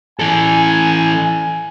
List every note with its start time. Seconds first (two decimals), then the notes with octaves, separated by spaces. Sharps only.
0.19 E3 A4 G#5